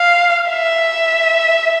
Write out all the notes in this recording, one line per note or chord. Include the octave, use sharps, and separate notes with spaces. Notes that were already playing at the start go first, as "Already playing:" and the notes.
Already playing: F5
E5